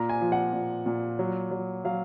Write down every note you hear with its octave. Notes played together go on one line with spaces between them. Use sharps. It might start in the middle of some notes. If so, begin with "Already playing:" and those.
Already playing: A#2 A#5
G#5
F3
F#5
A#2
A#2
F#3
F#3
F#3 F5